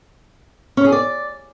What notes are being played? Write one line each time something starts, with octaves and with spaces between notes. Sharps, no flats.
C#4
G#4
D5